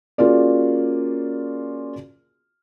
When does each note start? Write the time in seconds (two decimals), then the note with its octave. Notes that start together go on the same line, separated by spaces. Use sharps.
0.18 A#3 C#4 F4 F#4 G#4 D5